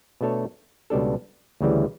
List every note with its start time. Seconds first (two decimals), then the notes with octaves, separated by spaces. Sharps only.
0.21 B2 A3 D4 A4 C#5
0.90 C#2 B2 G3 D4 A4
1.61 D2 C#3 E3 G3